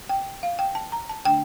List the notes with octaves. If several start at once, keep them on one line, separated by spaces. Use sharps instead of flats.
G5
F5
G5
A5
A#5
A5
D3 A3 D4 G5